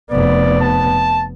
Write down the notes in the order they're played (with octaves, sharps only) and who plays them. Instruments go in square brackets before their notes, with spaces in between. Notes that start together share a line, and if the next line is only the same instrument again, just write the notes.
[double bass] F1 B3 [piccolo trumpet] D5
[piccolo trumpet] A5